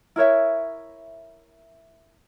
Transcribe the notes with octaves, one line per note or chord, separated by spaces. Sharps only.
E4 A#4 C#5 E5